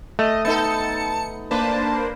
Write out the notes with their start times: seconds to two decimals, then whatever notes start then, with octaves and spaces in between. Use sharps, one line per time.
0.19 A3 D#5
0.45 B3 D#4 A4 A5 C#7
1.51 A#3 D4 B4 C5 A5